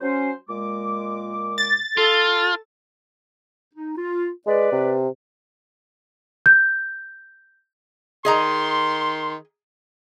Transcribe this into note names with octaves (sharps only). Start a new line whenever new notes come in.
F#3 C#4 C5
A#2 G#3 D6
A6
F4 A4
D#4
F4
G#3 B4 D5
C3
G6
D#3 G#4 D#5 A#5 C6